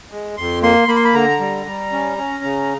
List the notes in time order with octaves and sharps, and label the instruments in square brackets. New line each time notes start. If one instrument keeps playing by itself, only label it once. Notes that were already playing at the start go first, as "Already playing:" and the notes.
[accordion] G#3
F2 C6
A#3 C6
A#3 B5
C6
B5
D3 A#5
G3
G3
C#4
C#4
C#3